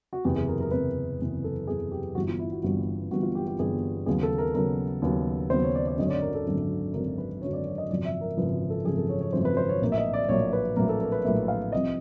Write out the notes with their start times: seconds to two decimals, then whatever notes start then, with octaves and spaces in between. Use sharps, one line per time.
0.13 F#4
0.25 F#1 E2 C3 G4
0.36 G#4
0.48 A#4
0.61 A#4
0.71 F#1 E2 C3 B4
1.19 F#1 E2 C3
1.44 A4
1.67 F#1 E2 C3 G#4
1.92 G4
2.15 G1 G2 E3 G3 B3 F#4
2.28 F4
2.39 E4
2.52 F#4
2.63 G1 G2 E3 G3 B3 F#4
3.11 G1 G2 E3 G3 B3 F#4
3.23 F4
3.35 G4
3.48 G4
3.59 G1 G2 E3 G3 B3 G#4
4.06 D#2 C#3 F#3 B3 G#4
4.23 A4
4.38 A#4
4.54 D#2 C#3 F#3 B3 A#4
5.02 D#2 C#3 F#3 B3
5.50 D#2 C#3 F#3 B3 C5
5.62 C#5
5.75 D5
5.87 D5
5.98 G#1 F#2 D3 F#3 D#5
6.06 C#5
6.10 D5
6.22 A#4
6.35 A4
6.46 G#1 F#2 D3 F#3
6.94 G#1 F#2 D3 F#3 A#4
7.18 B4
7.42 G#1 F#2 D3 F#3 C#5
7.53 D5
7.65 C#5
7.78 D#5
7.90 G#1 F#2 C#3 F3 D5
8.05 E5
8.21 A#4
8.37 G#1 F#2 C#3 F3 B4
8.70 A4
8.85 G#1 F#2 C#3 F3 G#4
8.98 A4
9.09 C#5
9.21 C#5
9.33 G#1 F#2 C#3 F3 C5
9.45 B4
9.57 C5
9.69 C#5
9.82 A#1 A2 F#3 A#3
9.92 E5
9.98 D#5
10.13 D5
10.29 A#1 A2 F#3 A#3 C#5
10.53 B4
10.76 A#1 A2 F#3 A#3 A#4
10.89 A4
11.01 A#4
11.12 B4
11.25 A#1 A2 F#3 A#3 E5
11.48 F5
11.72 C2 C3 F3 D#5